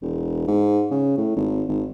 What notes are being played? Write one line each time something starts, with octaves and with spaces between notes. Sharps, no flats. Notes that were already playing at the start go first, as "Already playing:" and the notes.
E1
G#2
C#3
A2
G#1
G#1